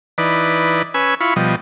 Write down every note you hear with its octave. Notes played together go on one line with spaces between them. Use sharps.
E3 D#4 B4 D5
C#4 B4 G#5 E6
E4 F4 B5 C#6
B2 F3 G3 D#5